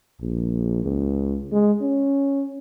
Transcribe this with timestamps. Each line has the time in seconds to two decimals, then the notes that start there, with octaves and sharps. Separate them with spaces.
0.21 A#1
0.84 C#2
1.52 G#3
1.81 C#4